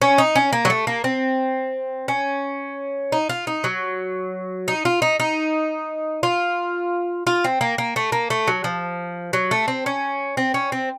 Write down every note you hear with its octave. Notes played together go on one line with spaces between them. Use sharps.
C#4
D#4
C#4
A#3
F#3
A3
A#3
C4
C#4
D#4
F4
D#4
F#3
D#4
F4
D#4
D#4
F4
F4
C4
A#3
A#3
A3
A#3
A3
F#3
F3
F#3
A3
C4
C#4
C4
C#4
C4